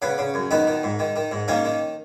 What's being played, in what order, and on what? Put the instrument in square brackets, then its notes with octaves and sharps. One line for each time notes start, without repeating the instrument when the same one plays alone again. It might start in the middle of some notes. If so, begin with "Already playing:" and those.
[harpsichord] C#3 B3
C#3
F#2
D#3 B3 D#4
D#3
G#2
D#3
D#3
G#2
D#3 A#3 C#4
D#3